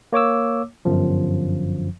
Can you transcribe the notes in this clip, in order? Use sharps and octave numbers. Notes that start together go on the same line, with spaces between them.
A#3 C#5 D6 E6
G1 F#2 F3